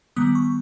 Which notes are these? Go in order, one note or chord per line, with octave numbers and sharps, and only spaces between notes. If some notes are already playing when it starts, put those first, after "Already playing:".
D#3 G3 B3 D#6
C#6